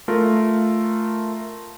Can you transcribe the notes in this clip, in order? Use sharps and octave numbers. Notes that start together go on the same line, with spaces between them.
A3 F4 A#4